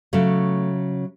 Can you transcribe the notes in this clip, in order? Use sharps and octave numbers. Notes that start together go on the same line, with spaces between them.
C#3 F#3 A3